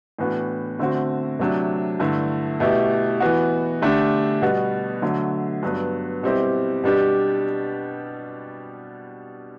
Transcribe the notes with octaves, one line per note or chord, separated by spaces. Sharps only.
A2 E3 B3 D4 F#4
D3 A3 C4 F#4
C3 F#3 A3 D4
G2 D3 A3 E4
B2 A3 E4 G4
E3 B3 F#4
D3 A3 D4 G4
B2 G3 B3 F#4
D3 F#3 A3
G2 F#3 B3
B2 G3 C4 E4 G4
B2 G3 D4 G4